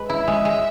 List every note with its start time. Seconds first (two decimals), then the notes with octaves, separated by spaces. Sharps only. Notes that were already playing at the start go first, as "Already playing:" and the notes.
Already playing: G#3 B4
0.09 E4 E5
0.28 G#3
0.45 G#3